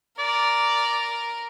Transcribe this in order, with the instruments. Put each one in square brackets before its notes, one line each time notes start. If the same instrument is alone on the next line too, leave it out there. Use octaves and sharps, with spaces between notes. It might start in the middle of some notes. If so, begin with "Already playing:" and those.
[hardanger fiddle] A#4 [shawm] D5